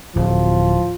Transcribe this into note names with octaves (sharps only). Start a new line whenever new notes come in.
D1 F3